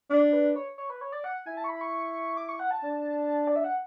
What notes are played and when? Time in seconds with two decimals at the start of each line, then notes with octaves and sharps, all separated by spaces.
0.10 D4 D5
0.33 B4
0.56 C#5
0.78 C#5
0.90 B4
1.01 C#5
1.12 D5
1.24 F#5
1.46 E4 G#5
1.57 A5
1.64 C#6
1.69 B5
1.81 C#6
2.37 D6
2.49 C#6
2.59 F#5
2.71 A5
2.83 D4
3.47 D5
3.56 E5
3.64 F#5